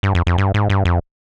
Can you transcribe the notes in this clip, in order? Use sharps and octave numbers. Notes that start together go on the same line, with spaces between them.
G2
F2
F2
G2
G#2
G2
F2